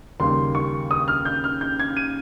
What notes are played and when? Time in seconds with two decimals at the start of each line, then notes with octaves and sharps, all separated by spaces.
0.20 D#2 C#3 G3 A#3 C6
0.55 C#6
0.91 D#6
1.08 F6
1.25 G6
1.44 F6
1.61 G6
1.79 G#6
1.97 D#7